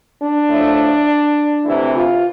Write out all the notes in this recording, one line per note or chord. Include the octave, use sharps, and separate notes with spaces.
D4
A2 F3 A3
D2 C3 E3 E4
F4